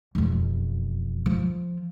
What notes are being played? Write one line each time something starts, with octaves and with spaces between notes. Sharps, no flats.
E1 F2
F3